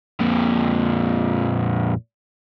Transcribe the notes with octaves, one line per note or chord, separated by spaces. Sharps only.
F2 A#2